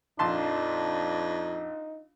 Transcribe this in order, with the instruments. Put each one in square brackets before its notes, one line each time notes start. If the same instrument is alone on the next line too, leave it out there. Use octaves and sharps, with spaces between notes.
[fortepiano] A#1 A5 C6 [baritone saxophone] F2 [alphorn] D4 [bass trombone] D#4